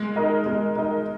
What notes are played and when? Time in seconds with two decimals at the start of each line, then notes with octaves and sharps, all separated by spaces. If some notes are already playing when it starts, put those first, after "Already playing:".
Already playing: G#3
0.16 D#4 A#4 D#5
0.46 G#3
0.76 D#4 A#4 D#5